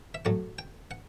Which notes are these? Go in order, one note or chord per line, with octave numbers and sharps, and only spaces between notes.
E5
A2 F#3 A3 F#5
G5
F#5